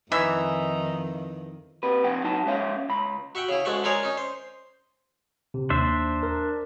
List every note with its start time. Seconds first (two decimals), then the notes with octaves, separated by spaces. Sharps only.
0.12 F2 D#3 E3 D#4 E5
1.83 C3 B4
2.04 F2 C4 F#5 G5
2.24 F#3 D#4 A5
2.46 G#3 C#4 C#5 E5 F5
2.89 C#2 B5
3.35 F#4 E5 F#5 G5
3.49 C#3 E4
3.65 G#2 G#3 A3 F#4 E5 F#5
3.84 G#3 D#4 G#4 A#4 C#5 D5
4.03 C#4 D#4
4.17 C5
5.54 C3
5.70 D#2 D4 C5 E5
6.23 A#4